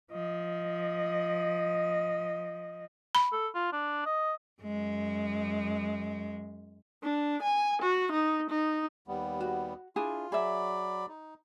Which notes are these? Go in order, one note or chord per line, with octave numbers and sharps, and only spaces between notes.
F3 D#5
B5
A4
F4
D4
D#5
F#2 G#3
D4
G#5
F#4
D#4
D#4
D#2 G3 B3
F#4
D4 E4 F4 G#4
F#3 G#4 D5 E5 B5
D#4